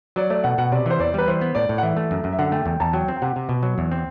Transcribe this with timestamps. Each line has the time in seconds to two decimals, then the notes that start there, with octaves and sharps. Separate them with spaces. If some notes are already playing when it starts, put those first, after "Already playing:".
0.16 F#3 D5
0.30 A3 D5
0.44 B2 F#5
0.58 B2 F#5
0.72 C3 D5
0.86 E3 C5
0.99 E2 D5
1.14 G3 B4
1.27 E3 C5
1.41 B3
1.55 A2 D5
1.69 A2
1.78 F#5
1.82 E3 E5
1.97 A3
2.11 F#2
2.24 F#2
2.33 E5
2.39 D3 F#5
2.52 A3 G5
2.66 E2 G5
2.80 E2 A5
2.93 F#3 G5
3.08 C4
3.16 G5
3.22 C3 F#5
3.36 C3
3.49 B2
3.63 F#3
3.78 E2
3.92 C4